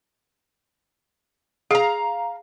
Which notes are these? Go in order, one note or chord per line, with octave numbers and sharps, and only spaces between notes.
G#4 F5 A#5